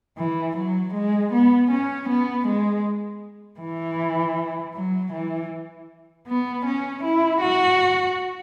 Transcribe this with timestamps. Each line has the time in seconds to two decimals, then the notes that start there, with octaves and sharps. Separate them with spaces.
0.18 E3
0.57 F#3
0.94 G#3
1.32 B3
1.70 C#4
2.08 B3
2.47 G#3
3.60 E3
4.75 F#3
5.12 E3
6.27 B3
6.65 C#4
7.04 E4
7.41 F#4